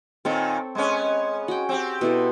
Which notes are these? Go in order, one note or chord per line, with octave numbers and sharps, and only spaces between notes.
A#2 D#3 C4 A4 C#5
G#3 B3 C#4
F#4 G5
C4 G4
B2 E4 A4